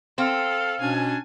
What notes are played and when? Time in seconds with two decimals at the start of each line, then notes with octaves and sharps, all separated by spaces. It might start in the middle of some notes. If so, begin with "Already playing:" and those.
0.18 C4 A4 F5
0.81 B2 C#4 D4 G#5